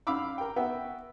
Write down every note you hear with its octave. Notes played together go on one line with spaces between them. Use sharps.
F#2 F5 B5 D6 E6
A#4 G5
B3 F#4 E5 G5